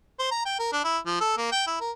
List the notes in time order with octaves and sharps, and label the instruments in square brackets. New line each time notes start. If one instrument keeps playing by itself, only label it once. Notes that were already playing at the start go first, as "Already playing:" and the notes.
[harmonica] C5
A#5
G5
A#4
D4
E4
F3
A4
A#3
G5
E4
A#4